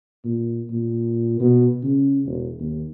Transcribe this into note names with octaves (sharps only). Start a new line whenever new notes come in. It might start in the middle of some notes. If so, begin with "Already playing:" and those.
A#2
A#2
B2
C#3
E1
D#2